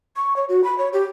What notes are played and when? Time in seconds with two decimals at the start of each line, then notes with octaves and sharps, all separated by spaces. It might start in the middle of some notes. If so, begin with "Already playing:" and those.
0.16 C#6
0.36 C#5
0.49 F#4
0.64 B5
0.78 C#5
0.93 G4